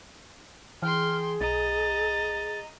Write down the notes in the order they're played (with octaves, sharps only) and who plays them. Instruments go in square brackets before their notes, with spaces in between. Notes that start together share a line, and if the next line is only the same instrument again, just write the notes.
[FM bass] E3 [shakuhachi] G#4 [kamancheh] G5 C6 [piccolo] F6
[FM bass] B1 [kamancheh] D#5 A#5 [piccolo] A6